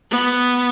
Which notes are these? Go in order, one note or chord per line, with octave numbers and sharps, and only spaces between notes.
B3